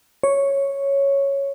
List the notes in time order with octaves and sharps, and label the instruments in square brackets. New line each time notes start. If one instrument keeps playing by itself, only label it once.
[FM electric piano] C#5